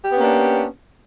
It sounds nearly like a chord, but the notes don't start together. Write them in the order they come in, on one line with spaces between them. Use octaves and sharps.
G4 B3 C#4 A#3 D4